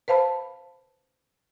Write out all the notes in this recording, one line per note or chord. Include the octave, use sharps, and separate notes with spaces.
B4 C5 F5 A5 B5